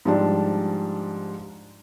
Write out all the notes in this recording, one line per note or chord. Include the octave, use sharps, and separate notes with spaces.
G#2 F3 G3 D4